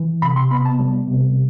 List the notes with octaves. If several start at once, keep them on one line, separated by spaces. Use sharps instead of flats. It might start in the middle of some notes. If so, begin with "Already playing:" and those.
Already playing: E3
C3 B5
C6
B3 B5
A5
G3
C3